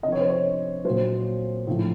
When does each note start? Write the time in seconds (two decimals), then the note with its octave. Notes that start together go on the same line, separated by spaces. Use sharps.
0.03 C3 D#5
0.08 F3 C#5
0.21 C5
0.28 C#5
0.84 A#2 F#3 C5
1.67 A2 F3